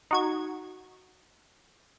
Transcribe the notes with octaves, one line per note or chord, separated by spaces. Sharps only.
D#4 F#4 G#6